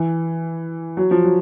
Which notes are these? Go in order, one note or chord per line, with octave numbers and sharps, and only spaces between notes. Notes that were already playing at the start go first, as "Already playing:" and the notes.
Already playing: E3
F#3
F3
F#3